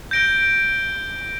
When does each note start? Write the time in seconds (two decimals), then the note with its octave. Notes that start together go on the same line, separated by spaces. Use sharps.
0.11 G6 A#6 D7 G7